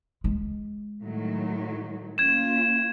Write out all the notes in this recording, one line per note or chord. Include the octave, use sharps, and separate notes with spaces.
G#3
A2 D#3 F#3
A#3 C#4 F4 G#6 E7